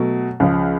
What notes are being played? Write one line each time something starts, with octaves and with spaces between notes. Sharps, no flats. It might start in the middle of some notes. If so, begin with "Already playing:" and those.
Already playing: B2 F#3 A3
C#2 C#3 F3